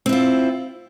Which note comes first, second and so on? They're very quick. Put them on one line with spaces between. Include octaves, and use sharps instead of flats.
C4 E4 F4